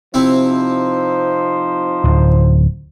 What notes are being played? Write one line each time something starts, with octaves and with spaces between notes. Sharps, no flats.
C3 F3 C4 D#4 E4 C5
D1